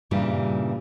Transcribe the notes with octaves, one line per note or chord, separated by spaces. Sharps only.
G2 A#2 C#3 E3 G3